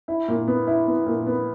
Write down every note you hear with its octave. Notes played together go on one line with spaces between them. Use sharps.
E4
A#2
B3
E4
B3
A#2
B3